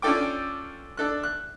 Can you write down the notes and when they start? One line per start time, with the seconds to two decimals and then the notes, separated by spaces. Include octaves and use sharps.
0.02 C#4 D4 F4 A4 G5 D6
0.97 D4 A4 F#6
1.23 F#6